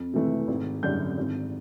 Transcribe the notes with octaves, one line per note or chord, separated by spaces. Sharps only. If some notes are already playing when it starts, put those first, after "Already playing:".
Already playing: F2
C3 E3 A3
G#1
F#2 D3 G3 G6
G#1